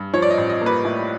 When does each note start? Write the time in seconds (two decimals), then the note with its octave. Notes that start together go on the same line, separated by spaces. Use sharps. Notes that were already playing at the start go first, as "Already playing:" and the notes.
Already playing: G2
0.14 F3 C#5
0.22 D5
0.30 D#5
0.38 A1
0.50 D#5
0.61 A#3 B4
0.85 A2